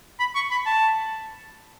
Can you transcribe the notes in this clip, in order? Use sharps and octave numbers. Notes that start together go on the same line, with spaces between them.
B5
C#6
B5
A5